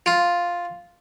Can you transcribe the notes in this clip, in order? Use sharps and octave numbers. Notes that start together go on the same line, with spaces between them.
F4